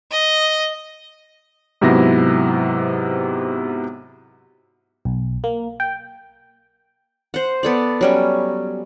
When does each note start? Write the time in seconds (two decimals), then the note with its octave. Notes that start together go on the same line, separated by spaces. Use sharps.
0.12 D#5
1.81 G#2 C3 F#3 B3 E4 A#6
5.05 B1
5.44 A#3
5.80 G5
7.34 C5 F#5
7.63 B3 A4 D5
8.01 F#3 G3 C#4